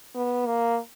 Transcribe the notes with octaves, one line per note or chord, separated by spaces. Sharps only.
B3
A#3